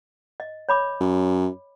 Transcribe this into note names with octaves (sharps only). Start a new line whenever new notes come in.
D#5
C#5 B5 D6
F#2